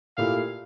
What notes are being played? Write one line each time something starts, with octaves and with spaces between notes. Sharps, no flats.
A#2 A3 E4 G4 F5